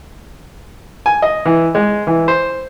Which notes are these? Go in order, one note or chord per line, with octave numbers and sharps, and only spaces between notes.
G#5
D#5
E3
G#3
E3
C5